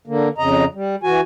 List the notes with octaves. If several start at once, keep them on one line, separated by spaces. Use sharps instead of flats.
D3 A#3
F2 C#3 D#5 A#5
G3
E3 F#4 G#5